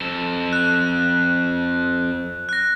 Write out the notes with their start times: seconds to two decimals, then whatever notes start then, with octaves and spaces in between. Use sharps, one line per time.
0.01 F2 A4
0.53 F#6
2.49 F#6 A#6